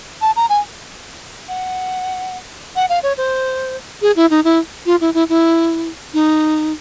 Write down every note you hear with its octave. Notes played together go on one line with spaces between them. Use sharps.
A5
A#5
G#5
F#5
F#5
F5
C#5
C5
G#4
E4
D#4
E4
F4
E4
E4
E4
D#4